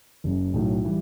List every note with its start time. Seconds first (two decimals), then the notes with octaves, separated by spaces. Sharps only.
0.24 F#1 F#2 C#3
0.54 B1 A2 F#3
0.85 E3 G3